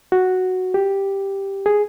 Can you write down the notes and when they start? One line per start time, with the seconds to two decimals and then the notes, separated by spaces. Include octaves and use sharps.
0.12 F#4
0.74 G4
1.66 G#4